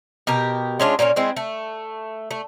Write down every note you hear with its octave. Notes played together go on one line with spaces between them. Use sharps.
B2 G4 A#4
G#3 C#4 D4 F4
A#2 A#3 B3 C#4
G#3 C4 E4
A3
A3